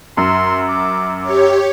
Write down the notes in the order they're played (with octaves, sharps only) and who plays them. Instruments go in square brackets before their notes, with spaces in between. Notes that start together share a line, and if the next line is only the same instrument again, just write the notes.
[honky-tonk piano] F#2 [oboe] C6
[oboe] D6
[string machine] G4 C#5 [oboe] D6